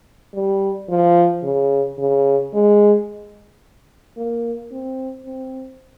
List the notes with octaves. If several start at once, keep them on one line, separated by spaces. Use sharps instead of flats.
G3
F3
C#3
C#3
G#3
A#3
C4
C4